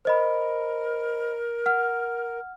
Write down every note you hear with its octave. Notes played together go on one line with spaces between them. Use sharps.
A#4 C5 D#5 B5
F#5 F6